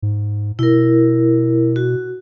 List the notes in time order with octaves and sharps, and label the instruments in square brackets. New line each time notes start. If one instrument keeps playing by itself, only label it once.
[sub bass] G#2
[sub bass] B2 [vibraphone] E4 A#4
[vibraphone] F#4